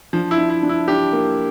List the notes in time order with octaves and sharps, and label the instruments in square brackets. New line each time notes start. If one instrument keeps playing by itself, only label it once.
[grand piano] F3 [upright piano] D4
[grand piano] E4
[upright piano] D4
[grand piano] E4
[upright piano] D4
[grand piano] E4
[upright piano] D4 [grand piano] G4
[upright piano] A#3